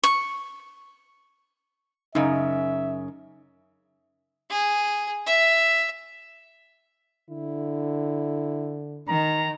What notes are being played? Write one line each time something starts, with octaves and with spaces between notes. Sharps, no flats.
C#6
F#2 C#3 D#4 E5
G#4
E5
D3 E4
D#3 A#5